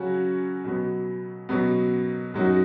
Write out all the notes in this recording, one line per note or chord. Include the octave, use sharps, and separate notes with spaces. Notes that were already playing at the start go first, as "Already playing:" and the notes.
Already playing: C#3 F#3 C#4 F#4
B2 F#3 B3
B2 F#3 B3
F#2 F#3 D#4 F#4